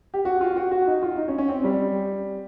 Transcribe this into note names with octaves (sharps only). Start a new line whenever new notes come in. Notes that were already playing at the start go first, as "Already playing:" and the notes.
G4
F#4
F4
F#4
F#4
D#4
F4
D#4
C#4
C#4
C4
G3